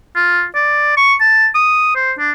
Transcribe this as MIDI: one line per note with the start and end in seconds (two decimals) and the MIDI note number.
0.16 0.45 65
0.55 0.95 74
0.97 1.14 85
1.20 1.48 81
1.55 1.92 87
1.95 2.12 72
2.19 2.32 62